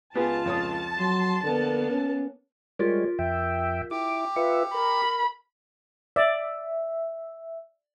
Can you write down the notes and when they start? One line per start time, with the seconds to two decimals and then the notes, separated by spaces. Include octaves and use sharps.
0.15 C#2 B3 F4 G4 G#4 A5
0.45 F2 C#5 D#6
0.99 F#3 C6
1.43 D3 A#3 B3
1.91 C#4
2.79 G3 G#3 F4 G4 A#4 C#5
3.19 F2 E5 G5
3.91 E4 G4 D6
4.36 F4 B4 E5 C#7
4.74 A#4 B5
6.16 D5 E5